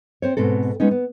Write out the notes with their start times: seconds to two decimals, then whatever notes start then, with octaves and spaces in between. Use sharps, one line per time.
0.22 C4 C5 C#5
0.37 G#2 B2 C4 A4
0.80 G#3 B3 C#4 D#4
0.91 B3